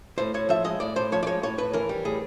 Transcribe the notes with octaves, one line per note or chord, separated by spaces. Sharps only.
A2 C5
A2 C#5
F3 E5
G#3 D#5
A2 D5
A2 C5
F3 C#5
D5
G#3 C#5
A2 C#5
A2 B4
E3 A#4
G3
A2 G#4